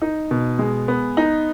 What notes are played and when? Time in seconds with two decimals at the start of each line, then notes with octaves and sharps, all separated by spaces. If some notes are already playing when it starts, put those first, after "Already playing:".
0.02 D#4
0.31 B2
0.59 G#3
0.88 B3
1.17 D#4